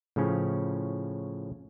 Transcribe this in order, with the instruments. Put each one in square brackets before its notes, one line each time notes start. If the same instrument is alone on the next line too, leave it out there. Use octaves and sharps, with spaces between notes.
[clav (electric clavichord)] A2 C#3 F3 C#4